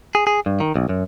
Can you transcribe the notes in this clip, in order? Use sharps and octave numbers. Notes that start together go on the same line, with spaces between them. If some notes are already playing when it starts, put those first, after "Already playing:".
G#4
G#4
G2
D#3
B1
F#2